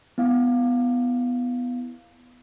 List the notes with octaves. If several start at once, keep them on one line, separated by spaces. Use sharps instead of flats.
B3 E4 F5